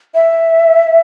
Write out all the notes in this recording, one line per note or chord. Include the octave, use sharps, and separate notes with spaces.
E5